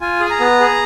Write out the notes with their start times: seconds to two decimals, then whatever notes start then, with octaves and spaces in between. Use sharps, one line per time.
0.01 F4 G#5
0.20 G#4 G#5
0.30 A#5
0.40 B3
0.60 G#4